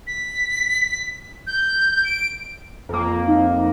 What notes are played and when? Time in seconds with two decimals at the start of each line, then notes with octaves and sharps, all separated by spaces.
0.07 B6
1.47 G6
2.04 D7
2.89 F2 A#3
3.27 D#4